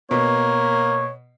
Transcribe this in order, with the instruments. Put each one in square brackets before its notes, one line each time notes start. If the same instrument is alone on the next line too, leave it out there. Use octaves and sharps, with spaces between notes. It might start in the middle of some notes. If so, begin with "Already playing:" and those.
[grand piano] B2 [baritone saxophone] A#3 [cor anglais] C#5